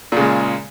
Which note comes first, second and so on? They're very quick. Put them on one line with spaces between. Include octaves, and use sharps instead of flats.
A#2 C#3 G#3